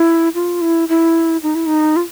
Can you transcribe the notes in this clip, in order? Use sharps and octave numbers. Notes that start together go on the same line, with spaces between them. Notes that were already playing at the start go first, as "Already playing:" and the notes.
Already playing: E4
F4
E4
E4
D#4
E4
D#4
F4